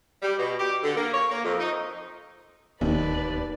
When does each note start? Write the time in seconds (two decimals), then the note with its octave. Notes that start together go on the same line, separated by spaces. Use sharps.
0.22 G3
0.39 B2
0.59 G4
0.83 D3
0.96 A#3
1.12 C#5
1.31 A#3
1.43 F2
1.60 D#4
2.81 D1 D#2 D#3 B4 D5